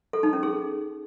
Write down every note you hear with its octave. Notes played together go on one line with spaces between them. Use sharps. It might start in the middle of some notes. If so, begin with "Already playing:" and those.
A4
D#4
C#4
G#4